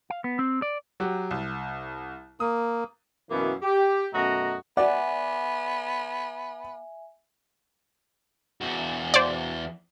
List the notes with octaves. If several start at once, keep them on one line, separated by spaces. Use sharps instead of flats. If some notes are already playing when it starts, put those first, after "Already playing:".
F5
B3
C4
D5
F#3 F#4 G4
C2
A#3 D#6
F#2 B2 E3 A#3 B3 E4
G4
F#2 B2 A3 F#4 D#5 A#5
B3 D5 E5 F#5 G#5
E2 F#4
C5 D5